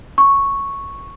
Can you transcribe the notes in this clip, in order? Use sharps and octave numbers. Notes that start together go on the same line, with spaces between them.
C#6